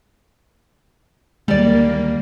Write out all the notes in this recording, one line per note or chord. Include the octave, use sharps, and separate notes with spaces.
D2 D#3 G3 G#3 A#3 D5